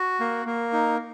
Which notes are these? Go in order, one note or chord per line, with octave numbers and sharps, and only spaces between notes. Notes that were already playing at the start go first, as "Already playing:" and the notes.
Already playing: F#4
A#3
A#3
D#4